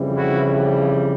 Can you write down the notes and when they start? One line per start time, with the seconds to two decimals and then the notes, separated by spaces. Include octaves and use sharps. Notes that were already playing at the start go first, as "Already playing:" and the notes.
Already playing: F2 C#3 E3 G3
0.16 E4 F#4